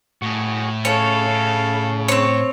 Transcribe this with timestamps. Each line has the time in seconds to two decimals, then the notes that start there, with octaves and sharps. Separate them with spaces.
0.22 A2 F#4 G#4
0.85 C#3 A4 C#5 F5
1.28 C#3
2.08 C4 C#5